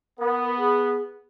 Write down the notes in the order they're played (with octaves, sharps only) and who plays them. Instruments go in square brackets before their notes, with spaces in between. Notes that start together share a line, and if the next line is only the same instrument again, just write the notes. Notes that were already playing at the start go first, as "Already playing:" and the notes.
[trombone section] B3 [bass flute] A#4
[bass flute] G#4